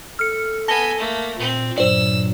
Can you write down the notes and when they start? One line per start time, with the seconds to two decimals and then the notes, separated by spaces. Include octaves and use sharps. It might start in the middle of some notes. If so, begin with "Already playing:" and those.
0.19 A4 F6 C#7
0.68 B3 G#5 A5 A#6 G7
0.98 A3 A#3
1.38 A#2 C4
1.78 G2 A#2 F#3 C5 D5 E6